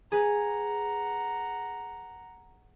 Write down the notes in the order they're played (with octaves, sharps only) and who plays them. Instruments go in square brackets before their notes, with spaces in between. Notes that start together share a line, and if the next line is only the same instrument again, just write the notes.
[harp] G#4 B4 [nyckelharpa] F#5 A#5